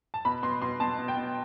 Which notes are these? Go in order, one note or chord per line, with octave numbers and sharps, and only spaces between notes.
A5
B2 B5
B2 C6
B2 C6
B2 A5
B2
G5
B2